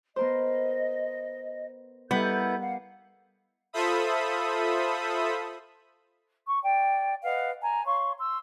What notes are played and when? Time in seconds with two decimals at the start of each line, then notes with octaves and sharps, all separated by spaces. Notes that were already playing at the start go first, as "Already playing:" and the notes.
0.16 B3 A#4 C5 D#5
2.11 G3 B3 E4 A4 A#4 D#5 G6
2.60 F5 F#5
3.73 F4 A4 C5 E5 B5 D#6
6.47 C#6
6.63 D5 G5
7.24 B4 D#5 F5 F#5
7.62 G#5 A#5
7.86 C#5 F5 C6 C#6
8.18 C6 E6